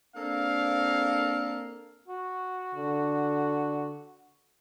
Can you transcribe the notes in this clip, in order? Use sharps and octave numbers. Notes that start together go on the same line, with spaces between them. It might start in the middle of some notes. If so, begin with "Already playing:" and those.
A#3 C4 D4 A4 A#4 F5
F#4
D3